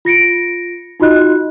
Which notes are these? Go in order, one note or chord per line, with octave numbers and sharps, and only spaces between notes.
F4 A#6 C#7 D7
D#4 F4 F#4 D#5 F#6